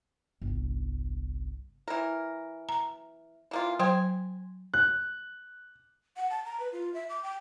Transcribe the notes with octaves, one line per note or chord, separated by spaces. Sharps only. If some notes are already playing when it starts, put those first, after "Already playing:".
G1 C2
E3 A#4
A#5
E3 A#3 F4
F#3 C5 G5 G#5
F#6
F#5
A5
A#5
B4
F4
E5
D6
G5